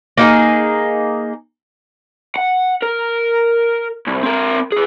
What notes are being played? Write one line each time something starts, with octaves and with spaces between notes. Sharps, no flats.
A#3 D#4 G4 G#4
F#5
A#4
C2
C4 A#4
G#4 B4